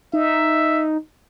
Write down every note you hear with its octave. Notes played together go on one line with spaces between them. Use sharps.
D#4 E5